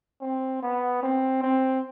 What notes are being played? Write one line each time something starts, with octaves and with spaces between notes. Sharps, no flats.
C4
B3
C4
C4